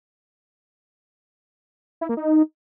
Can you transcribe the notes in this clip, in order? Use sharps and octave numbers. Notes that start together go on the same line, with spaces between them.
E4
A#3
D#4